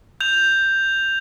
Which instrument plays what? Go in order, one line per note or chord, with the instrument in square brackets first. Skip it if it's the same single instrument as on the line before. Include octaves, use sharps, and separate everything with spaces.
[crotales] G6 F7